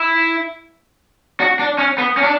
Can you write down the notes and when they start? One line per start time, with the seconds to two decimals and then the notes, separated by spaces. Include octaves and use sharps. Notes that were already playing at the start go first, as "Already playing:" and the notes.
Already playing: E4
1.40 F#4
1.59 D4
1.78 C#4
1.98 B3
2.17 C#4
2.23 D4